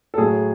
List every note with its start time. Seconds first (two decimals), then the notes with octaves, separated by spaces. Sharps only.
0.14 A4
0.18 A2 F#3 G#4